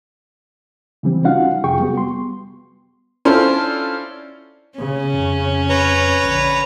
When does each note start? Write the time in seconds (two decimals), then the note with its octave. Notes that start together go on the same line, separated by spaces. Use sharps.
1.03 C#3 E3 G3 C4
1.24 C#4 D#4 F4 F#4 F5 F#5
1.64 F2 C3 F4 G#4 G5 C#6
1.80 G3 B3 F#4
1.97 B3 C6
3.25 C#4 D4 E4 F4 A4 C5
4.79 C#3 C#4
5.14 F2
5.69 B4 C#5 A#5
6.24 A#1 D3